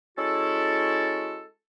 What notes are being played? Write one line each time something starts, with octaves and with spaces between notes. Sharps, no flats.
G#3 C#4 E4 F#4 A4